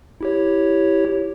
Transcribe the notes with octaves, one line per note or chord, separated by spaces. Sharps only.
E4 G4 C#5